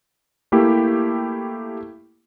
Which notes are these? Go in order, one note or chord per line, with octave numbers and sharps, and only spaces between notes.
A3 A#3 E4 G4